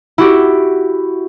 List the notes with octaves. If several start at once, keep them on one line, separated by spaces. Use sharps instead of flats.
E4 F#4 G4